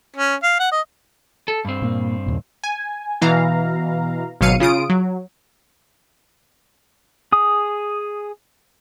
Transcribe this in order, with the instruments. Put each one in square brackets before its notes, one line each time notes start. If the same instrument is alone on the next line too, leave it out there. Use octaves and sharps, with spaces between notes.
[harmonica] C#4
F5
F#5
D#5
[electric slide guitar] A4
G2 C4
[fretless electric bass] A#2 A#3
D#2 A#2
[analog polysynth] G#5
B2 E3 F5 A#5
G#1 B2 F#3 F5 C#7 D#7
C#3 F4 D#6 D7
F#3
[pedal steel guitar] G#4 D#6